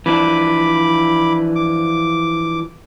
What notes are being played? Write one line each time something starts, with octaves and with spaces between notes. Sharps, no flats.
E3 F3 D4 B5 D6
D6